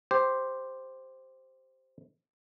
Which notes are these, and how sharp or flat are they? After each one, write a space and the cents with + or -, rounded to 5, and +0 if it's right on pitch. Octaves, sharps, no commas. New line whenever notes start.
G4 +0 C5 +0